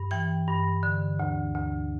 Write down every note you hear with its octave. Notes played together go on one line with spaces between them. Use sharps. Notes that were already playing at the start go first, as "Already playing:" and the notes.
Already playing: G2
E3 G5
G2
D3
D2
D2